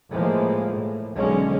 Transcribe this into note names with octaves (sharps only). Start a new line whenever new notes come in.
A2 E3 F3 G#3 A#3
A2
B1 D3 G#3 C#4